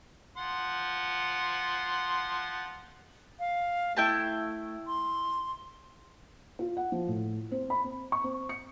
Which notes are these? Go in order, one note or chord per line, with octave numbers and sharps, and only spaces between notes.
F3 F#5 C6
F5
A3 E4 G5 A5
C6
F4
F#5
F3
A2
C4
B5
C4
C#6
C4
C#7